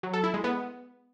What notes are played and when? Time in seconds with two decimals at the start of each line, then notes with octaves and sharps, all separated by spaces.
0.03 F#3
0.13 A4
0.24 E4
0.34 G#3
0.44 B3